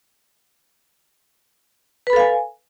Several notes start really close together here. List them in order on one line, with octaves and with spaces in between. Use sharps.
B4 B5 A4 F5 G#5